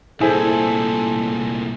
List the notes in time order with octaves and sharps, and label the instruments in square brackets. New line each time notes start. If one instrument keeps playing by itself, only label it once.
[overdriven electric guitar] C2 A#2 [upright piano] E4 G#4 C5 [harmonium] A4